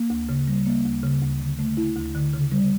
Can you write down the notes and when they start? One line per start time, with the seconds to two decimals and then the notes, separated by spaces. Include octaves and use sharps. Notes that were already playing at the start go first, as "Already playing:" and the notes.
Already playing: A#3
0.10 D2
0.29 C#3
0.47 G3
0.66 A#3
0.85 D2
1.03 C#3
1.22 D2
1.40 D3
1.59 A3
1.77 E4
1.96 D2
2.15 D3
2.33 C#3
2.52 G3